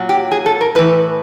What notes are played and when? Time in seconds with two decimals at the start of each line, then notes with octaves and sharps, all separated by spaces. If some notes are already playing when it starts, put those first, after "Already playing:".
Already playing: A#2 F#3
0.09 G4
0.31 G#4
0.46 A4
0.61 A#4
0.75 A2 E3 B4